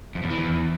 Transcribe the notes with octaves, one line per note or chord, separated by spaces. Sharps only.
F2
E2
E3
E2